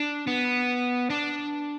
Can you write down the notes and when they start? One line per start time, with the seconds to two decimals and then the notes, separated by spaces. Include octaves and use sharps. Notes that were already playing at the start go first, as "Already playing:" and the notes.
Already playing: D4
0.27 B3
1.10 D4